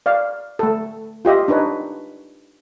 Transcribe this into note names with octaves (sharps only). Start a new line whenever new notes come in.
D5 F5
A3 A4
F4 G4 D#5 E5
D4 D#4 B4 C#5